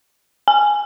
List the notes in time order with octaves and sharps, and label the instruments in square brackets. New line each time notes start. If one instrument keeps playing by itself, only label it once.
[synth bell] G#5